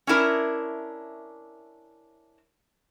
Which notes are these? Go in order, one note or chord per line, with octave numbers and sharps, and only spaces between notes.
C#4 D4 E4 A#4